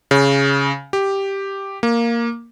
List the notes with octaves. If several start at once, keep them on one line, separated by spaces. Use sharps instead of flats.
C#3
G4
A#3